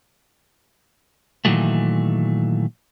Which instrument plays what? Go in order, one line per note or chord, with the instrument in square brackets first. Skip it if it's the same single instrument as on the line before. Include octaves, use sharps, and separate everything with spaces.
[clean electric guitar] A#2 D#3 E3 F#3 A3